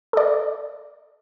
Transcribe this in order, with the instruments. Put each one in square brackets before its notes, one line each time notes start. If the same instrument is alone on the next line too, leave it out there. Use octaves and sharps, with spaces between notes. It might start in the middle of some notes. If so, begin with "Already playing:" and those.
[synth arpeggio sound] A4 D5